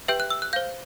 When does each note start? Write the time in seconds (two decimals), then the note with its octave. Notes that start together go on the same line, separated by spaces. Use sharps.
0.08 G4 B4 E5 G5 G6
0.20 F#6
0.30 E6
0.42 F#6
0.53 C5 F5 G6